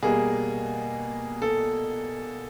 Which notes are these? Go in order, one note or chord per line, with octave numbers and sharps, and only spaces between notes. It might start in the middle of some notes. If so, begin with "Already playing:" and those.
B2 G3 A#3 G#4
A4